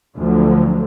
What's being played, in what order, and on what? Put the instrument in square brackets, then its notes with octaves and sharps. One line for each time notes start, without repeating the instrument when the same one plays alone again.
[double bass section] D2 D3 F3 F#3